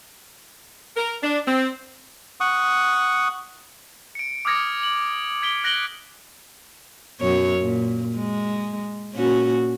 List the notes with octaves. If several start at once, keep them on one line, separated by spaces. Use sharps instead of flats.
A#4
D4
C4
F#5 C#6 D#6
C#7 D7
D6 D#6 F6 G#6 A#6 C#7
F#7
G#6 B6 D7 G7
F#6 A#6 D7 F#7 G7
F#2 B2 C#5
A#2
G#3
A#2 C#4 F#4